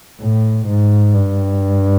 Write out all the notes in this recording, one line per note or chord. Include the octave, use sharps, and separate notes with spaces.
A2
G#2
G2